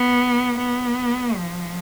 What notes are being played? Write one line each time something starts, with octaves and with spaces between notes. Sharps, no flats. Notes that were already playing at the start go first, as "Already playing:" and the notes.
Already playing: B3
B3
F3